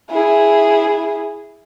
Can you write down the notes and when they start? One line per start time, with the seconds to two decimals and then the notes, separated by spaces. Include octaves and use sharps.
0.10 E4 G#4